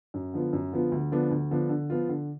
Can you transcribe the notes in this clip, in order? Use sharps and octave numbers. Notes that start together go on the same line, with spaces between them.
F#2
D3 F3 B3 F4
F#2
D3 F3 B3 F4
D2
D3 F3 B3 D4
D2
D3 F3 B3 D4
D3
F3 B3 F4
D3